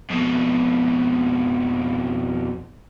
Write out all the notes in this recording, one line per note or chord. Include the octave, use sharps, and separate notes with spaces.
F2 B2